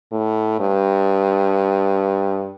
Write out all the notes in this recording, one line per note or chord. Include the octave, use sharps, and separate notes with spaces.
A2
G2